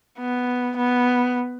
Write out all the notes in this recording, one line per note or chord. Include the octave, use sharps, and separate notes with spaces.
B3
B3